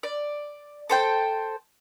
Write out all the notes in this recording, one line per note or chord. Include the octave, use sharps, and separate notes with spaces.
D5
A4 C5 G5